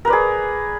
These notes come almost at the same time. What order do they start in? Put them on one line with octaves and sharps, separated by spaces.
A#4 B4 D5 G#4